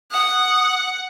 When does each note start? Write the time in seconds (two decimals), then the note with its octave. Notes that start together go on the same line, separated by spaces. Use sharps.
0.12 F#5 D#6